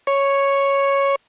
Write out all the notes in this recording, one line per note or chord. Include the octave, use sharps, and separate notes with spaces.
C#5